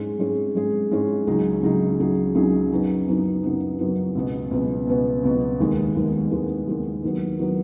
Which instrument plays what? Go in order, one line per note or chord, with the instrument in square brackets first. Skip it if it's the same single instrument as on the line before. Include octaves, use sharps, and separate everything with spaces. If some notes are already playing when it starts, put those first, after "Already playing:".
Already playing: [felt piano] G#2 G#3 C#4 G#4
G#2 G#3 C#4 G#4
G#2 G#3 C#4 G#4
G#2 G#3 C#4 G#4
C#2 C#3 F#3 D#4 G#4
C#2 C#3 F#3 D#4 G#4
C#2 C#3 F#3 D#4 G#4
C#2 C#3 F#3 D#4 G#4
F#2 C#3 F#3 B3 D#4
F#2 C#3 F#3 B3 D#4
F#2 C#3 F#3 B3 D#4
F#2 C#3 F#3 B3 D#4
C#2 B2 B3
C#2 B2 B3
C#2 B2 B3
C#2 B2 B3
D#2 D#3 G#3 B3
D#2 D#3 G#3 B3
D#2 D#3 G#3 B3
D#2 D#3 G#3 B3
D#2 D#3 F#3 B3
D#3 F#3 B3